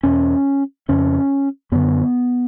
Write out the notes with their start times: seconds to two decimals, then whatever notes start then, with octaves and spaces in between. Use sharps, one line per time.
0.03 E2 B2 C#4
0.89 F2 C#3 C#4
1.72 F#2 D3 B3